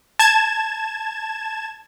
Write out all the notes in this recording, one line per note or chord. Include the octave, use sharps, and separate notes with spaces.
A5 G#6 E7